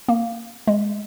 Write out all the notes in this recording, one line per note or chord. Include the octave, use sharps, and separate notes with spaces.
A#3
G#3